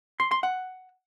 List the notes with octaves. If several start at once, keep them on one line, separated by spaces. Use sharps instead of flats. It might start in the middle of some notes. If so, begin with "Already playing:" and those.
C6
C6
F#5